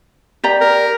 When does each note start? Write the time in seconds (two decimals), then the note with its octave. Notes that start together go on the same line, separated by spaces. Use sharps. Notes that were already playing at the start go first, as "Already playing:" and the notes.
0.44 G4 D5 A#5
0.61 A#4